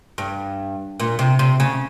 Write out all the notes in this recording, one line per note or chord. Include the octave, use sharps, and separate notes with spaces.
G2
A#2
C3
C3
C#3